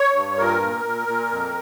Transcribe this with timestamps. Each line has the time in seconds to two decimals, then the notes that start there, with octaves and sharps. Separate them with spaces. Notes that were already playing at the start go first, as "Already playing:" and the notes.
Already playing: C#5
0.15 G2
0.38 A#2 A#4
0.62 A#2
0.85 A#2
1.08 A#2
1.31 F2